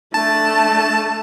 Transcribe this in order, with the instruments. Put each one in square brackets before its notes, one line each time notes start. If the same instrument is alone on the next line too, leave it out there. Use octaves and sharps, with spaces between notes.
[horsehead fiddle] A3 D4 [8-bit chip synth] A5